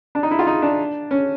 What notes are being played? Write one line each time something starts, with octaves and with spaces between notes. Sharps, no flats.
D4
D#4
E4
F4
D#4
D4
C#4